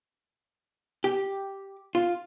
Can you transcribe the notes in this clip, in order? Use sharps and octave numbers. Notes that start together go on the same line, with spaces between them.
G4
F4